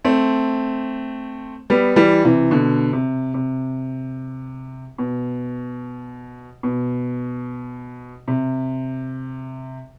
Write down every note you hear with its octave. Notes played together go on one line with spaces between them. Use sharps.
A3 C4
G3 B3
E3 G3
C3 E3
B2 D3
C3
C3
B2
B2
C3